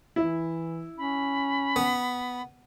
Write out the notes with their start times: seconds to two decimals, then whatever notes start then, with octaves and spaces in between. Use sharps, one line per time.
0.16 E3 E4
0.98 C#4 B5
1.76 B3